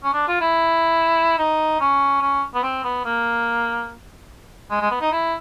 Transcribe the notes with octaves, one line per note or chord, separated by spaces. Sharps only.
C#4
D4
F4
E4
D#4
C#4
C#4
B3
C4
B3
A#3
G#3
G#3
B3
D#4
E4